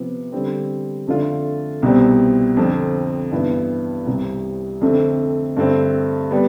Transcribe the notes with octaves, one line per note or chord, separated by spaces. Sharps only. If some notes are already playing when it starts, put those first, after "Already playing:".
Already playing: C3 F3 B3
D3 G3 C4
F2 D3 A3 D4 F4
C2 B2 G3 C4
F2 D3 F3 C4
G2 E3 B3 E4
C2 C3 G3
F2 D3 A3 C4
G2 D3 A3 C4
G3 B3